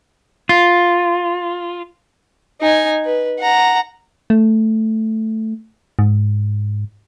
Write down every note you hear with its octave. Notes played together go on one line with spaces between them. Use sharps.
F4
D#4 G#5
B4
F#5 A#5
A3
G#2